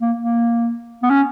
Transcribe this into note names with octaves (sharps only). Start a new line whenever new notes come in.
A#3
A#3
B3
C#4